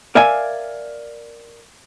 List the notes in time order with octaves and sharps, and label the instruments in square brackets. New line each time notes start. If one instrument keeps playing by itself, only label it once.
[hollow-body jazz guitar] A#4 D5 E5 F5 G#5